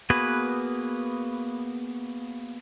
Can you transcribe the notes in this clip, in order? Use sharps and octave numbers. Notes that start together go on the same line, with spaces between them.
A#3 B3 F#4 G#4 B4